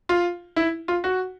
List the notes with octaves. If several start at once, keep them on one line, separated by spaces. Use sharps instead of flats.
F4
E4
F4
F#4